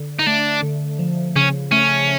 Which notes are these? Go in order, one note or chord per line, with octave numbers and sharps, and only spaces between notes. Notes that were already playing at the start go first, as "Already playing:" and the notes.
Already playing: D3
D#4
A3 D4
D3
F3
C#3 C#4
A3 C#4